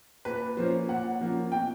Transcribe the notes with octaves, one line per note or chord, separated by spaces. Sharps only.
A#2 B4
F3 A#3 C#4 C5
A#2 F#5
F3 A#3 C#4
B2 G5